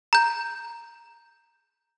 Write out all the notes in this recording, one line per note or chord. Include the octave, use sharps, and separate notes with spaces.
A#5 G6